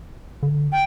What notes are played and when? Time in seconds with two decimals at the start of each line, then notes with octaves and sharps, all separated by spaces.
0.43 D3
0.72 G5